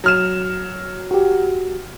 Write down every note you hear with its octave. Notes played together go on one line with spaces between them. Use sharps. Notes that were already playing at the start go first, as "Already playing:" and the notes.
F#3 F6 E7
F#4 G4